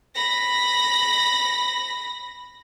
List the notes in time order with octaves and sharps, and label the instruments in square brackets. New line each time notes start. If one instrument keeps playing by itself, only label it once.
[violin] B5 A#6